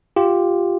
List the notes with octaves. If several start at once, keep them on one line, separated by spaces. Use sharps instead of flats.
F4 G4